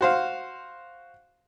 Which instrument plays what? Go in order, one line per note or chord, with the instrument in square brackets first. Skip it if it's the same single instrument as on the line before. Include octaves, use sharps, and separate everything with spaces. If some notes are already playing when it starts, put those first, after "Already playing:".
[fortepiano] F#4 C5 F5